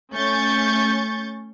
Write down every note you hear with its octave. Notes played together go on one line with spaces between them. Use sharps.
A3 C#4 C#6 G6 A6